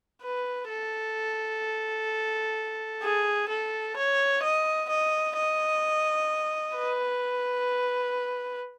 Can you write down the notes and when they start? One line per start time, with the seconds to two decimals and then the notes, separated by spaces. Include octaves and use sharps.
0.23 B4
0.69 A4
3.02 G#4
3.49 A4
3.96 C#5
4.43 D#5
4.89 D#5
5.37 D#5
6.76 B4